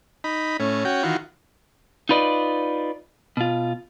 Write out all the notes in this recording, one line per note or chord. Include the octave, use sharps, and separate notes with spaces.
D#4 B5
A2 C#4
C#4 F#4 G5
D#3 E3 F4 F#4
D#4 F4 B4 D5 D#5
B2 F4